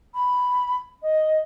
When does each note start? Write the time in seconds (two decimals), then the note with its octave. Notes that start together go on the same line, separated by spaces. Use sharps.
0.14 B5
1.02 D#5